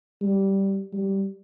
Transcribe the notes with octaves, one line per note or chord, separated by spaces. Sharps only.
G3
G3